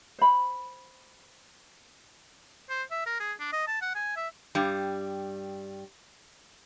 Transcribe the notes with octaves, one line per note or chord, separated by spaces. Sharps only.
C5 B5
C5
E5
A#4
G#4
D4
D#5
A5
F#5
G#5
E5
G2 G3